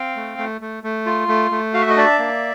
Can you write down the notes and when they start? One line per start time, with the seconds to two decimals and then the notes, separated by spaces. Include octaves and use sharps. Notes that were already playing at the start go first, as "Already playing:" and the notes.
Already playing: C4 F5 G5
0.16 A3
0.38 A3
0.61 A3
0.83 A3
1.06 F4
1.28 A3
1.51 A3
1.73 F#4 F5
1.82 E5
1.90 D#5
1.96 D4 D5 E5
2.19 A#3